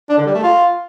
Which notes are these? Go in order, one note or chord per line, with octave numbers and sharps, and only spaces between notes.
D4
D3
G3
A3
F4